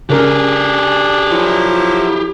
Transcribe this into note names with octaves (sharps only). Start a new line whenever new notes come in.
C#3 D4 G4 G#4 A#4
F3 F#3 E4